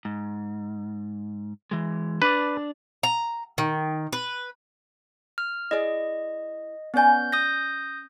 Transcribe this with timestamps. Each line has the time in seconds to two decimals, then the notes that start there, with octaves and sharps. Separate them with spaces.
0.05 G#2
1.71 E3 G#3
2.22 D4 B4 D5
3.03 A#5
3.58 D#3
4.13 B4
5.38 F6
5.71 E4 G#4 D5 D#5
6.94 B3 C#4 D5 G#5 G6
7.32 D#6 G6 A#6